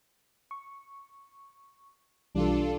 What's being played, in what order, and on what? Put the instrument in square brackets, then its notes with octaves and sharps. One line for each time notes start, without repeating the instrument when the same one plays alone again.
[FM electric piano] C#6
[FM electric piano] B1 E3 G3 [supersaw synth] D4 F4 A4